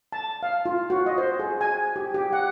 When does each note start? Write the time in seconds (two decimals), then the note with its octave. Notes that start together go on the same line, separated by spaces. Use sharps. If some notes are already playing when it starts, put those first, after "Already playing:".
0.12 A5
0.43 F5
0.65 F4
0.90 F#4
1.06 D#5
1.18 C5
1.39 G#4
1.61 G#5
1.96 G4
2.14 G4
2.33 F#5